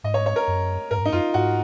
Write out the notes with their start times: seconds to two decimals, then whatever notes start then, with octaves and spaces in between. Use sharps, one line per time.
0.04 G#2 D#5
0.14 C#5
0.26 C#5
0.36 A#4
0.47 F#2
0.91 G#2 A#4
0.98 F#2
1.02 G#2
1.05 D#4
1.12 F#2 F4
1.34 G#2 F#4